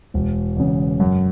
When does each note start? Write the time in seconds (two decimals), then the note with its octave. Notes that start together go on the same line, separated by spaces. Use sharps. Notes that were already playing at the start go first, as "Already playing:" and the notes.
0.14 E1
0.57 E2 C#3
1.00 F#2